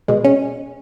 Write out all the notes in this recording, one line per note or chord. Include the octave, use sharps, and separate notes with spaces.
B2 G#3
C#4